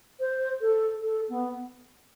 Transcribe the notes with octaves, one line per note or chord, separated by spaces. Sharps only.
C5
A4
A4
B3